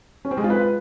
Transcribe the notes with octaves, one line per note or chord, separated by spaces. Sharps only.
C#4
C4
G#3
F4
B4